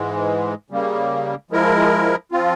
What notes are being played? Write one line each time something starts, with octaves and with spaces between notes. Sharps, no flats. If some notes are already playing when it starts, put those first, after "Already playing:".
Already playing: G#2 E3 G#3
C#3 G3 A#3
F3 G#3 E4 A#4
F3 C4 F4